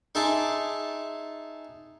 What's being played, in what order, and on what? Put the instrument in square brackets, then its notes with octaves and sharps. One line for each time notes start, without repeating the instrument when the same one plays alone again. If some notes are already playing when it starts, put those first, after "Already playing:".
[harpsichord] D#4 G#4 E5 A5 C6 D6